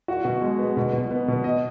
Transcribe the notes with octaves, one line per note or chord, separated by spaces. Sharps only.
F#4
B2
G#3
B3
B2
B2
B3
B2
D#5